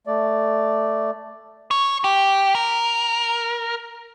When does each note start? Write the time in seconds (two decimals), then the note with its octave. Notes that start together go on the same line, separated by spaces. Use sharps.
0.07 A3 D5
1.71 C#5
2.04 G4
2.55 A#4